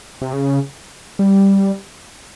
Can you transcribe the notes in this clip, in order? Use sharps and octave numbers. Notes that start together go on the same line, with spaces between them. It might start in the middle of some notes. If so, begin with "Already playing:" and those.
C3
C#3
G3